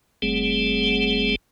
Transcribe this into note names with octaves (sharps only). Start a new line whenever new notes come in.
F#1 G3 A3 C4 G#4